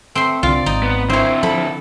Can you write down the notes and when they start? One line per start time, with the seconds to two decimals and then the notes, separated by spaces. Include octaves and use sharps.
0.15 A3 C4 C6
0.43 C2 D3 F4 D5
0.66 G#1 D#4
0.83 B3
1.10 D3 C4 E4 C5 C#5
1.43 F3 A4 B5